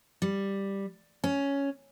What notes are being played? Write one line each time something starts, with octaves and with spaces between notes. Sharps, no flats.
G3
C#4